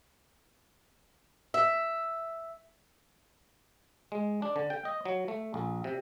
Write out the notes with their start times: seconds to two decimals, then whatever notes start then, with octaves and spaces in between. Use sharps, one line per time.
1.54 E5
4.12 G#3
4.42 D4
4.56 D3
4.70 G5
4.85 D#5
5.05 F#3
5.28 A3
5.54 A#1
5.84 C3